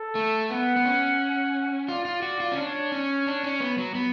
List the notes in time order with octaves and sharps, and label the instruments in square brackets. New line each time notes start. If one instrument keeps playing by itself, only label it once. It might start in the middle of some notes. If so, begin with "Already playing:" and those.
Already playing: [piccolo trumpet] A4
[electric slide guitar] A3
[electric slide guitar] B3 [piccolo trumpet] F#5
[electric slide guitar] B3
C#4
[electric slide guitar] F4 [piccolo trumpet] D5
[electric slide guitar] F4
F#4
F4
C#4
[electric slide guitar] D4 [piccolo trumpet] C#5
[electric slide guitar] C#4
D4
C#4
B3
F#3
B3